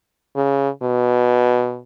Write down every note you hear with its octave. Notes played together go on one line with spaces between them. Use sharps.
C#3
B2